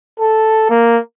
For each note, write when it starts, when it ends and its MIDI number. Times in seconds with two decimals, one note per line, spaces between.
0.20 0.68 69
0.70 0.99 58